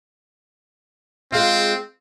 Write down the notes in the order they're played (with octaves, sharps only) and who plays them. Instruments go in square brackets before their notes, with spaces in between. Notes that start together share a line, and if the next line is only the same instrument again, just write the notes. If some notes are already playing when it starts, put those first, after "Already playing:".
[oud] G#3 F4 [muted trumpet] C4